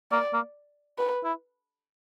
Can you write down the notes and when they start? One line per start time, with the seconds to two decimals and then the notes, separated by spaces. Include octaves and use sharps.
0.11 A#3 D5
0.33 A#3
0.98 B4
1.24 E4